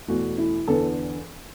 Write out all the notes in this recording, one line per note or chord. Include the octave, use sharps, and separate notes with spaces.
E2 B2 A3 F#4
E4
E2 D3 B3 A4